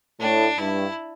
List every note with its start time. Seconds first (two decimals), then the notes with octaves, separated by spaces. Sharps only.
0.20 A2 D4
0.58 G2 E4